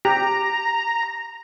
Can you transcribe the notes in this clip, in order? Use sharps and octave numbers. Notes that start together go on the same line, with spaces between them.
G4 A#5